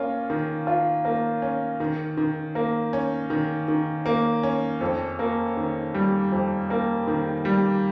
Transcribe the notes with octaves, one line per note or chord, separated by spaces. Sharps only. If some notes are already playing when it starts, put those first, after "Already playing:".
Already playing: A#3 C#4 F4
D#3
F4
A#3
C#4
D#3
D#3
A#3
C#4
D#3
D#3
A#3
C#4
F2
A#3
D#3
G3
F2
A#3
D#3
G3